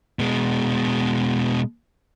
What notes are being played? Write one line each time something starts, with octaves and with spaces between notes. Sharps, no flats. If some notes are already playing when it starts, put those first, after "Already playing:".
B2 G#3